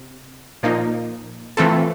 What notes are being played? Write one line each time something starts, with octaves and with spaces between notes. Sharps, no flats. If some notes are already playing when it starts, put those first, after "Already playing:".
Already playing: C3
A#2 F3 A#3 D#4
E3 A3 C4 F4 A4